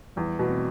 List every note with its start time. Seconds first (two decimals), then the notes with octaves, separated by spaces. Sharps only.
0.16 E2 G3
0.39 B2 A3
0.50 C4